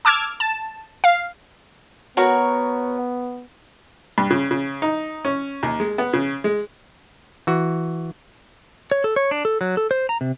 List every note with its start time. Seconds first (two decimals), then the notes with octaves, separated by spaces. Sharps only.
0.05 A5 D6 E6 F6 G#6
0.40 A5
1.04 F5
2.17 B3 F#4 A#4 C#5
4.18 G2
4.30 C#3
4.51 C#3
4.82 D#4
5.25 C#4
5.63 D#2
5.80 G#3
5.98 B3
6.13 C#3
6.44 G#3
7.47 E3 F#4
8.91 C#5
9.04 A4
9.16 C#5
9.31 D4
9.45 A4
9.61 F#3
9.77 A4
9.91 C5
10.09 A#5
10.21 C3